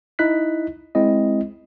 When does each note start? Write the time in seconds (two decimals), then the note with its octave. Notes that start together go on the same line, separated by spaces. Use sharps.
0.19 D#4 E4 D#5 F#6 B6
0.95 G#3 C4 E4 D#5